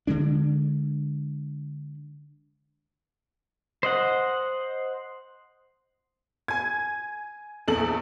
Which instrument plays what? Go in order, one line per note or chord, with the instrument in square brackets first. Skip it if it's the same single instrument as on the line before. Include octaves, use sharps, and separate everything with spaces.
[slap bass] D3 G#3 D4
[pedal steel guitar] C5 D#5 F#5
[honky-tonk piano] G#5 G#6
A#1 E2 A4 F#7